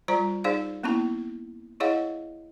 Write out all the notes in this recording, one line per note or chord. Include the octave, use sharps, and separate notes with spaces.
G3 F4 C5 D5 A#5
D#4 G#4 C5 D5 F5
A#3 B3 C#4 E4 A5
E4 G#4 C#5 D#5 F5 F#5